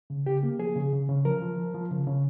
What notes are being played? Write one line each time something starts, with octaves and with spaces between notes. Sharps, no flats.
C#3
C#3 G4
A#3
F3 G#4
C#3
C#3
C#3
F3 A#4
F3
F3
F3
C#3
C#3